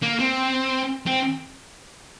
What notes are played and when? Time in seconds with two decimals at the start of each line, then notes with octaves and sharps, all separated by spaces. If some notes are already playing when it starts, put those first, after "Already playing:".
0.02 A#3
0.19 C4
1.07 C4